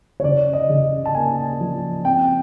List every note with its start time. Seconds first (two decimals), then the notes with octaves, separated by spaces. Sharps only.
0.20 C#5
0.23 C#3 D5
0.53 D#5
0.69 C#3
1.05 A5
1.15 A#3 G#5
1.60 F3
2.05 C4 G5